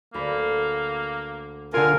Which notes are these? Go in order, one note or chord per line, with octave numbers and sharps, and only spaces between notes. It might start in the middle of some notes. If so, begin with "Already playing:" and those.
D2 A#3 B5
D3 F4 A#4 G#5